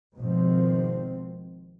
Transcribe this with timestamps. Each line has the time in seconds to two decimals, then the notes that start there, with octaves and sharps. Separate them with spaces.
0.18 G#1 B2 F3 C4